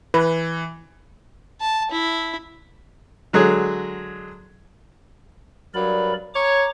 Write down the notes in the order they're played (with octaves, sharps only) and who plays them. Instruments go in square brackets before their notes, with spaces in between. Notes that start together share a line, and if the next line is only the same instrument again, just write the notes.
[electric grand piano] E3 [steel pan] B4
[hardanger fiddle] A5
E4
[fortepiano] D3 F#3 G#3 G#4
[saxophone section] G2 F#3 [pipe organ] A#4 D5 B5
[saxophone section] C#5 [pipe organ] A#5 D6